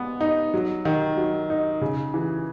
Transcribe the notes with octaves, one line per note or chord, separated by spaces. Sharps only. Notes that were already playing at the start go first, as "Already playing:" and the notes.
Already playing: G#3 B3
D#4
F#3
D#3
F#3
D#4
C#3
E3